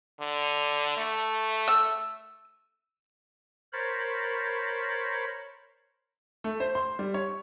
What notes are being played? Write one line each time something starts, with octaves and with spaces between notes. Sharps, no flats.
D3
A3
E6
A#4 C5 C#5 B5 A6
A3
C5
C6
G3
C#5